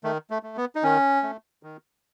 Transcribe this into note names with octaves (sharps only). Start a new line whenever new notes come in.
D#3 A3
A3
A3
B3
D#4
D#3 C#4
A3
D#3